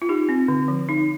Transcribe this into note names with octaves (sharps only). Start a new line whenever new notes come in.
F4
D#4 G4
C4
D3
F3
D#4